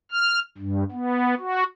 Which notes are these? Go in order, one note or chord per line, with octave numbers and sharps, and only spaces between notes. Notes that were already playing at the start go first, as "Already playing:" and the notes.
F6
G2
B3
F#4